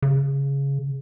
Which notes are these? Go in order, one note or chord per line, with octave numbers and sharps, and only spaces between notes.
C#3